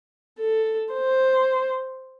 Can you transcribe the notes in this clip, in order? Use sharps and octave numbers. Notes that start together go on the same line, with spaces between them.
A4
C5